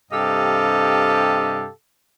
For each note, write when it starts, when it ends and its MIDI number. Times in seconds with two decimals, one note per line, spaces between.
0.12 1.68 43
0.12 1.68 48
0.12 1.68 67
0.12 1.68 69
0.12 1.68 75
0.12 1.68 77